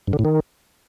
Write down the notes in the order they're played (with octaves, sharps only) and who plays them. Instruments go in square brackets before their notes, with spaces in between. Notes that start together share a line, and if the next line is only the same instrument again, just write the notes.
[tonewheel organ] G2
D3
A2
D#3